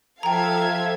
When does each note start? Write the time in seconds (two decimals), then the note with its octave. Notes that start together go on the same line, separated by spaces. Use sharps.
0.23 F3 A4 E5 F5 G5 A#5 G#6